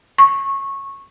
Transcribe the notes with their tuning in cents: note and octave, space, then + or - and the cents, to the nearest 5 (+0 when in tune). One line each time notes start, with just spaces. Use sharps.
C#6 -15